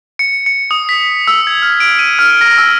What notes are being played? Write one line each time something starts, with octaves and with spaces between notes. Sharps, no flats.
C#7
C#7
D#6
B6
E6
G#6
F6
D7
D#7
F6
A#6
E6